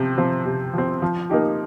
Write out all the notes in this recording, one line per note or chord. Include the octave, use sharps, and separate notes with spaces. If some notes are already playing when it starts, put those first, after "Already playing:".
Already playing: C3 F3 C4
F3 C4
C3
F3 C4
F3
A#3 D#4 G4